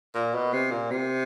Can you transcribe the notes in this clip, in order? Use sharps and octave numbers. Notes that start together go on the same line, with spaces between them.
A#2
B2
C3
A#2
C3